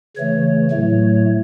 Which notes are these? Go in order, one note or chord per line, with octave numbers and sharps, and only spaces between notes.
C#3 E3 A3 C#5
A2 F#3 A3